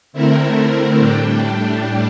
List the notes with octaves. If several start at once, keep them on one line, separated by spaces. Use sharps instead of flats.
D3 A3 C4 E4 A#4
A2 G3 D4 G4